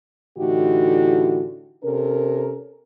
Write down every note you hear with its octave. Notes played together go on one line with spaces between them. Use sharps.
A2 D3 E3 D#4 F#4 G4
C3 C#4 A4 A#4